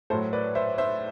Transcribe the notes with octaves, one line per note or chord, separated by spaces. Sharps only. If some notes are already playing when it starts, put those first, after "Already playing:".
A2 F#3 A4 C5
B4 D5
C5 E5
C5 E5